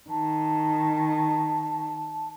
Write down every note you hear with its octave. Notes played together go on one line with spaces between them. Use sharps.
D#3 A5